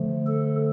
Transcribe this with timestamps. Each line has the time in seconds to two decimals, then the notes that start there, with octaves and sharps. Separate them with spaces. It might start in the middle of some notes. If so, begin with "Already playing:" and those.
Already playing: D3 F3 A3
0.26 A4